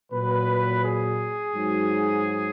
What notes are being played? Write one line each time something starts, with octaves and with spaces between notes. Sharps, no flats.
A#2 F#3 B4
G#4
G#2 F#3